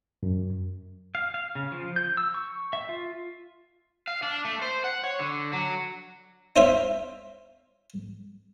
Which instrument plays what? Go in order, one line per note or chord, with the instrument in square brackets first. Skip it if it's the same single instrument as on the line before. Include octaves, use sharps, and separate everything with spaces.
[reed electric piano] F#2
[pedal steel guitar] F5
F5
C#3
F3
G6
E6
C#6
E5
F4
[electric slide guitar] F5
D4
A3
C5
F#5
C#5
D3
F#3
[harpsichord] D#4 F4 C5 C#5 E5 F5